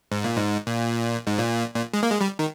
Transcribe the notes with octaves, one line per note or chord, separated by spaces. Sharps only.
G#2
A#2
G#2
A#2
G#2
A#2
A#2
G#3
A#3
G#3
G3
D#3